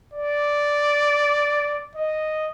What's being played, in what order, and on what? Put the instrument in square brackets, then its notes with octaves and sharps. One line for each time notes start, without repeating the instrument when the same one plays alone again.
[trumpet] D5
D#5